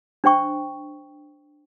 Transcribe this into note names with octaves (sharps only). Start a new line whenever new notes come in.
D4 C5 G5 C#6